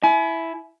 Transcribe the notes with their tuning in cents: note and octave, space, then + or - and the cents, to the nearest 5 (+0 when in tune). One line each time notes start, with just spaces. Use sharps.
E4 +0 G#5 +35